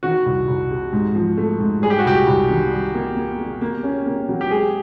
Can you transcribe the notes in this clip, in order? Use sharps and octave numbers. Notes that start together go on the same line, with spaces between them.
D#3 F#4
C2
C2
C3
G#2
F3
A3
G#2
G3 G#4
G4
F#4
C2 G4
C2
D#3
G3
A#3
A#3
A#3
A#3
C#4
A#3
F#3
G4
G#3 G#4